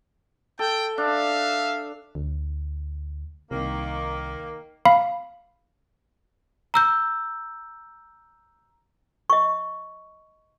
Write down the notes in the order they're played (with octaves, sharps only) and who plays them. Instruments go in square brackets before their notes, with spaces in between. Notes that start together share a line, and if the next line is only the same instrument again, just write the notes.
[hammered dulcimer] A4 [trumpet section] G5
[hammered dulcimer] D4 [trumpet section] E5 F5
[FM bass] D2
[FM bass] C2 [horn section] D#3 A#3
[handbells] F5 B5
[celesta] A#5 E6 G6
[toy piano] D#5 C#6